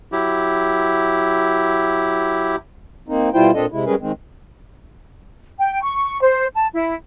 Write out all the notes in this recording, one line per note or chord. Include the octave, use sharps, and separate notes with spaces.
F#3 E4 G4
A#3 C4 D#4
B2 G3 E4 F4 C5 G5
A#2 C4 D4 A4 D#5
C3 G#3 E4
G3 G#3 C#4 G#4 A#4 B4
D#3 G#3 C4
G5
C#6
C5
A5
E4